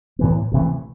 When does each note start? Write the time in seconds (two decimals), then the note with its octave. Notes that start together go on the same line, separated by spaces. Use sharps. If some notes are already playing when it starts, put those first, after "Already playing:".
0.19 A2 E3 B3
0.52 D2 C3 E3 A3